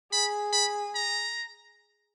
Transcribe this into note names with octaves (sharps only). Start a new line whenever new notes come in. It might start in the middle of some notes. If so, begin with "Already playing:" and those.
G#4 B5
B5
A#5